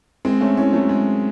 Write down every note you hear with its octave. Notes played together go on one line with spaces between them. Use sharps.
G#3 C4
A3 C#4
C#4 E4
F#3 A3
G#3